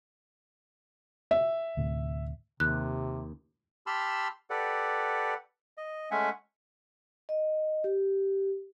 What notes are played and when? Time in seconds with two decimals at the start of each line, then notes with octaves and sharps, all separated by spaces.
1.31 E5
1.77 D2 A2 C3
2.60 D#2 C3 F#6
3.87 G4 A5 B5 C6 E6 F6
4.50 G4 A4 B4 D5 F#5
5.78 D#5
6.11 G#3 A3 C#4 E5 F#5 G#5
7.29 D#5
7.84 G4